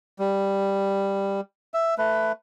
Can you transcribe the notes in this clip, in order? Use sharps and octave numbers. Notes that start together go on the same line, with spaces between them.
G3
E5
A3 B4